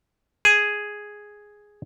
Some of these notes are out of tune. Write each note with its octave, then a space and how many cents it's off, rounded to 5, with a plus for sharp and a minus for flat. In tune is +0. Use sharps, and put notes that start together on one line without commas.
G#4 +0